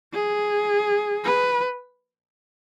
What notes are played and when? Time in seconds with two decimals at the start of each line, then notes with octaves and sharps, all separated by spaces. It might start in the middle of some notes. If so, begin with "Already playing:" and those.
0.13 G#4
1.24 B4